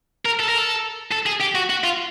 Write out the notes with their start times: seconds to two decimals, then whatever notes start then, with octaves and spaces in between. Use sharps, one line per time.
0.26 A#4
0.40 A4
0.49 A#4
0.58 A4
1.11 A4
1.26 G#4
1.40 G4
1.55 F#4
1.70 F#4
1.84 F4